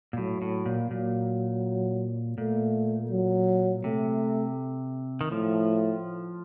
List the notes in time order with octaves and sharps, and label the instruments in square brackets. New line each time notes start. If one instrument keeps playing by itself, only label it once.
[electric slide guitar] A#2
[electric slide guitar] A2 [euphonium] F#3
[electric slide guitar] A2
A#2
[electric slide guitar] A#2 [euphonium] F#3
[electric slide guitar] A#2 [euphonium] A3
[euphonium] F#3
[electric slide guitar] C3 [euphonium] A3
[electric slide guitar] D#3
[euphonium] A2 [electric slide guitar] F3